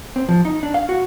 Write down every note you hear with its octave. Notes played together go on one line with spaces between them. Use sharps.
C4
F3
D#4
D4
F5
F#4